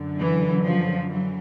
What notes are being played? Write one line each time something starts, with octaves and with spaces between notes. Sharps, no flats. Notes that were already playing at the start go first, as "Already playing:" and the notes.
Already playing: F#2 D3
E3
F3
E3 F#3